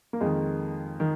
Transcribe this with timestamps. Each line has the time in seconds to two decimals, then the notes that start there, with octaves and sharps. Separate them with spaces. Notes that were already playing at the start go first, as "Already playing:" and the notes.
0.13 A#3
0.21 F2 D#3 G#3
1.00 D#3